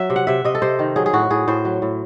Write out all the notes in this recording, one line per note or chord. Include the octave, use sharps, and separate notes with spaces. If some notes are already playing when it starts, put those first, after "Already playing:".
Already playing: F#3 E5
C3
F#5
C3 E5
C3 D#5
A4
C3 C5
D#3
F#3 G#4
G#4
A2 F#4
A2 G#4
A2 C5
F#3
A2